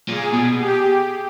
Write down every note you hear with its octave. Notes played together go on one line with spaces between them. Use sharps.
A#2 G#4
B2
G4